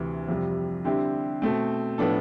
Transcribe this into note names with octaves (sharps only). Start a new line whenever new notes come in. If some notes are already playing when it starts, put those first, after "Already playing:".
Already playing: D2 C3 E3
F2 C3 G3
D3 G3 C4 E4 G4
B2 A3 C4
A2 F3 B3 D4 A4